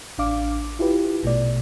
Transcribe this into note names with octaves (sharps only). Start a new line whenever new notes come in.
A1 D4 F5 D6
E4 F4 G4 B4
A#1 B2 A3 D5